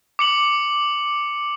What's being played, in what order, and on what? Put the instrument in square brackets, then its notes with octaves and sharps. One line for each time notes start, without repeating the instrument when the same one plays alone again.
[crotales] D6 C#7 F#7